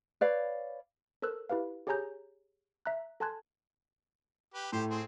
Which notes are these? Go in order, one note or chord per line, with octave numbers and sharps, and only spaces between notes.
B4 C#5 D5 F5
A4 A#4 C5 E6 F#6
E4 G4 B4 F5
G4 G#4 C#5 G#5 A#5 G6
E5 A#5 F#6
A4 G#5 A5 C6 F#6 G#6
G4 B4
A2 G4 C5 C6
C4 G#4 C6